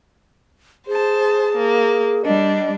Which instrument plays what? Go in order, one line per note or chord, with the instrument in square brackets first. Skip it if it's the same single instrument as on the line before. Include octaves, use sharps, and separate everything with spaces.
[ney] G#4 [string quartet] C5 A5
[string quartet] A#3
[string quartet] G3 D4 [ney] D#5